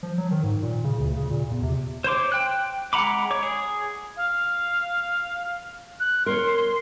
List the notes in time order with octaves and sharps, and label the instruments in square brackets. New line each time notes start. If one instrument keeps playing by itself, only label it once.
[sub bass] F3
F#3
D#3
G#2
A#2
C#3
D2
C#3
A#2
E2
C3
[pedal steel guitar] C5 C#5 C6 D6
G5 F#6
G#3 F#5 A#5 B5 D6
C#5 D6
G#4
[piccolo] F5
F#6
[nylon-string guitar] A#4 C#5 [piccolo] C6
[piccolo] C6